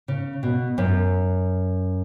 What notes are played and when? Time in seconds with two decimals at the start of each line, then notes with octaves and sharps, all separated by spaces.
0.08 C#3
0.43 B2
0.78 F#2